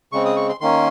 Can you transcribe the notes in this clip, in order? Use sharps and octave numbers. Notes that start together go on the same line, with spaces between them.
C#3 G#3 C4 C#6
D#6
C#6
C6
D#3 A#3 C#4 C6